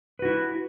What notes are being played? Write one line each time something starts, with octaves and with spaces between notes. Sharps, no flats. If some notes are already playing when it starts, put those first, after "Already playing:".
E4 F#4 B4